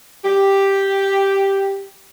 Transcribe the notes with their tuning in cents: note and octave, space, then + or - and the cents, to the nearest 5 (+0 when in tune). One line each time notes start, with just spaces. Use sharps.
G4 +0